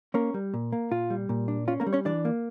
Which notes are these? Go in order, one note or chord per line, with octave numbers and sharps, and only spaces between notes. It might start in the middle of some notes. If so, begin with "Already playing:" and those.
A#3 C#4 A#4
G3
A#2
A#3
A#2 F4
G3
A#2
D4
C#4 F4
A#3 A#4
G3
C#4 C#5
E3 D4 D5
A#3